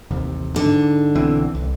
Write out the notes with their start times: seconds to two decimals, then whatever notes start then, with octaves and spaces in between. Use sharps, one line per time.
0.11 A1 D#2 C3
0.56 G#2 D3
1.15 B1 E3 C4
1.55 C2